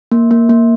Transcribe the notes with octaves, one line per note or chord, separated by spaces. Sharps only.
A#3
A#3
A#3